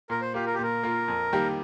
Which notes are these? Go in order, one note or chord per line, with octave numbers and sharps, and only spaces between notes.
A#2 A#4
C5
A#3 F4 G4
A#4
G4
A#2 A#4
A#3 F4
F2
D#3 G3 A#3 G4